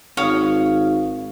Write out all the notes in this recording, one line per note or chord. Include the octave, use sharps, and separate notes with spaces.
G#1 C#5 F5 D#6